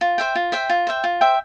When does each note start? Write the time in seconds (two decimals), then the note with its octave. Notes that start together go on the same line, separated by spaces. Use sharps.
0.01 F4
0.18 C5 E5 G5
0.35 F4
0.52 C5 E5 G5
0.69 F4
0.87 C5 E5 G5
1.04 F4
1.21 C5 E5 G5